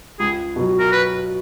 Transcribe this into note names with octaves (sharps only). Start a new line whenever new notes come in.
C#2 G#4
B2 F#3
A#4
B4